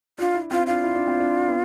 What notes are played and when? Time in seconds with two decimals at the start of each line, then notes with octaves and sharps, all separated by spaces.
0.18 D4 F4
0.34 E4
0.51 C4 F4
0.67 D4 F4
0.83 E4
0.95 D4
1.07 C4
1.20 D4
1.48 B3